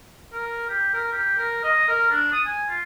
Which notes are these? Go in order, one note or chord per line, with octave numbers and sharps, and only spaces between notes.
A#4
G4
A#4
G4
A#4
D#5
A#4
D4
D#6
G#5
F4